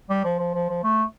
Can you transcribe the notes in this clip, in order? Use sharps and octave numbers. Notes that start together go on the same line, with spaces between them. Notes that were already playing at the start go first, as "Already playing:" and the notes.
G3
F3
F3
F3
F3
A3